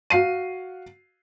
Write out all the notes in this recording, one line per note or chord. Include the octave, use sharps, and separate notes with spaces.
F#4 F5 C7 D#7